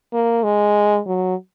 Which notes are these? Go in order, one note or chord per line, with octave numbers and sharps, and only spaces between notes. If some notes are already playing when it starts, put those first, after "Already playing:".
A#3
G#3
F#3